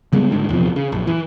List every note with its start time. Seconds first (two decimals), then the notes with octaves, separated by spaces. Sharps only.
0.13 C#3 G3 G#3 B3
0.30 F#1 G#2 D3
0.49 D#1 E2 C3 F3
0.76 C#3
0.92 A#1 F#2
1.07 E3